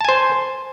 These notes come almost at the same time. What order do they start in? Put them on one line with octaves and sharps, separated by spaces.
A5 G#5 C5